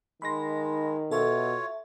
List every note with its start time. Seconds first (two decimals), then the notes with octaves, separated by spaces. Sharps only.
0.22 D#3 G#3 B5 C6 A#6
1.11 B2 F4 A4 C#5 E5